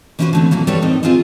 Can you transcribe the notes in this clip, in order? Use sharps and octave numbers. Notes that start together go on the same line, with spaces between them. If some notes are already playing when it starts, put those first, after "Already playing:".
E3 C#4 E4 F#4 B4 C5
D3 A3 C4
A#2 E3 F#3 A#3
G3 A4 B4 C#5
A2 C4 D#4 A#4
A#3 C4 D#4 F4 G#4